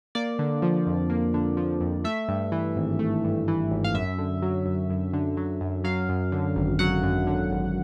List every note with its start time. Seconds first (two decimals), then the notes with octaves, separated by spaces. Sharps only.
0.15 A#3 D5
0.39 D3
0.62 F3
0.87 F2
1.10 A#3
1.34 D3
1.57 F3
1.81 F2
2.04 A3 E5
2.28 G2
2.52 E3
2.76 G#1
2.99 A3
3.24 G2
3.48 E3
3.71 G#1
3.84 F5
3.94 F#2 E5
4.19 D3
4.42 F#3
4.66 F#2
4.90 F#2
5.13 D3
5.37 F#3
5.61 F#2
5.84 F#3 F5
6.09 F#2
6.32 D3
6.56 G#1
6.79 F#3 F#5
7.03 F#2
7.27 D3
7.51 G#1